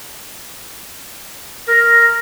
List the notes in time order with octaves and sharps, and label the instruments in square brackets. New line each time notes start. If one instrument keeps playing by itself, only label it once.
[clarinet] A#4 [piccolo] A#6